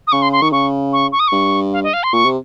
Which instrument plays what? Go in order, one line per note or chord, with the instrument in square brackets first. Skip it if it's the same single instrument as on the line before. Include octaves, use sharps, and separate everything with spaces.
[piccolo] D#6
[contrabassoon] C#3 [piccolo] C#6
[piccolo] C6
C6
[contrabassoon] D#3 [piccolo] C#6
[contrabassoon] C#3 [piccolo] C#6
[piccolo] C#6
C#6
D#6
[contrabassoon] G2 [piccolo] C#6
[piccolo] F5
D#5
F5
C6
[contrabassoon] A#2 [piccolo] C#6
[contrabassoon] C3